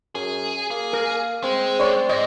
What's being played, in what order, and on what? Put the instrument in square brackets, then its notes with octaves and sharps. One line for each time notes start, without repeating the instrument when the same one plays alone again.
[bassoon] F#2 [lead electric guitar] G#4
[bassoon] A#3 [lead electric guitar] G#4
[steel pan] A#4
[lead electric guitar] G#3 [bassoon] C4
[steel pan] C#5 D5 C6
[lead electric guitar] G#2 [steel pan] D#5